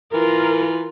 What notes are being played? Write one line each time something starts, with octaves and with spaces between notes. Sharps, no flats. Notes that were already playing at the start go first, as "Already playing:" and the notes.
E3 F4 A#4